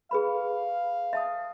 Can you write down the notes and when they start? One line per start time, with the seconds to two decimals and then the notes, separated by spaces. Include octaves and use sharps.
0.11 G#4 B4 F5 B5
1.13 E5 A5 D#6